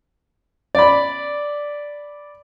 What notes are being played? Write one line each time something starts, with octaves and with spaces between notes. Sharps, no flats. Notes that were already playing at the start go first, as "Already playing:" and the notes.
D5 B5